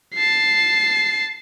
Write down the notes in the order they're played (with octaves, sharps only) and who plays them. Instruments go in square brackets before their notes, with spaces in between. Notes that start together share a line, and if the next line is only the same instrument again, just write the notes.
[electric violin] A5 C7